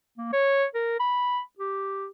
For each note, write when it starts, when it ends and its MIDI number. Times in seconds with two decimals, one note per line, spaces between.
0.18 0.28 58
0.33 0.65 73
0.75 0.98 70
1.00 1.41 83
1.59 2.07 67